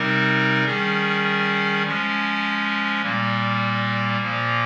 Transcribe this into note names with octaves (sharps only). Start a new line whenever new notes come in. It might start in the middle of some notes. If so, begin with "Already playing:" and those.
Already playing: C3 G3 C4 D#4 A#4
D#3 G3 C#4 G#4
F3 G#3 C#4
A#2 G3 A#3
A#2 F3 A#3